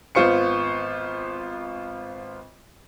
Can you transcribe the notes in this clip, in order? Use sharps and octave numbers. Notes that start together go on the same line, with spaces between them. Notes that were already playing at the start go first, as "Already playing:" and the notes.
G#1 B3 F4 C5 C#6 C#7